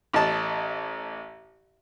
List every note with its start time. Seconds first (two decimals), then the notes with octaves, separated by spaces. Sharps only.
0.14 A1 D#5 A5